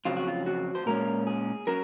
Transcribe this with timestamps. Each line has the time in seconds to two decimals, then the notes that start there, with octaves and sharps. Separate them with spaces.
0.05 F2 C#3 F#3 C4 F4
0.17 F#4
0.27 F4
0.46 F#4
0.75 C5
0.86 A#2 G#3 C#4 A#4
1.27 G#4
1.67 F#3 C#4 A#4